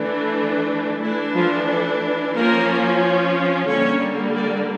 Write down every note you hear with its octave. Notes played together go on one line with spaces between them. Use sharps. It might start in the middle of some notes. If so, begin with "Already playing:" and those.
Already playing: E3 A3 D4
E3 A3 D4 E4
F3 F4
A3 A4
F3 A#3 C#4 A#4
D3 G3 A#3 C#4 C#5
D4 D5